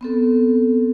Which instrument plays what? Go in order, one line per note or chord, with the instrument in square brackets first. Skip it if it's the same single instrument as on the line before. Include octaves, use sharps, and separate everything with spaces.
[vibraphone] B3 C4 A4